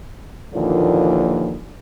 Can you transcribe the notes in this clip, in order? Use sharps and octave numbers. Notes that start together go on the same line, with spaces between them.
D#2 A#2 D3 E3 F3